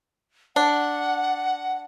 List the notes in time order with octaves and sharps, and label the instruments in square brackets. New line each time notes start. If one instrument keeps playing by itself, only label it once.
[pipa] D4 [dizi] F#5